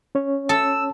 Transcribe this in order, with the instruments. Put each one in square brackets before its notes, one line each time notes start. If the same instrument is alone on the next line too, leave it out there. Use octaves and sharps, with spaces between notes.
[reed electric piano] C#4 C#5
[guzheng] A4 [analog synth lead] E6